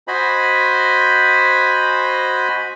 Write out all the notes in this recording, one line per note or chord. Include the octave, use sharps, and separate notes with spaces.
F#4 C5 D#5 G#5 B5